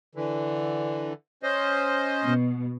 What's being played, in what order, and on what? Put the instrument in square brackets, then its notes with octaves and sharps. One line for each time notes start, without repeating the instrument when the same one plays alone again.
[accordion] D3 E3
C#4 C5 D#5
[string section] B2